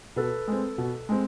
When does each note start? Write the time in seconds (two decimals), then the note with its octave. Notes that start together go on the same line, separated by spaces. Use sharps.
0.16 B2 A4 B4
0.48 G#3 C4
0.78 B2
1.09 G#3 C4